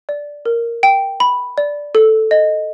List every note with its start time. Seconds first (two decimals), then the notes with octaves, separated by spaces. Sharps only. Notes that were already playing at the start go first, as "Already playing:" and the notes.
0.09 D5
0.46 A#4
0.83 G5
1.20 B5
1.58 D5
1.95 A4
2.31 D#5